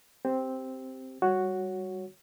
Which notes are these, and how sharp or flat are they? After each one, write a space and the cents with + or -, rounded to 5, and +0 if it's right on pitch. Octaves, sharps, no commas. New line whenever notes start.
C4 +0 G4 +0
G3 +0 F#4 +0 C#5 +0